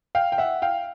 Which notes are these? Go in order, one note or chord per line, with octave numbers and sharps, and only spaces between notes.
F5 G5
G5
E5 F#5
F5 G5